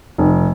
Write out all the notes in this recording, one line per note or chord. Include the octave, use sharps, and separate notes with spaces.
F1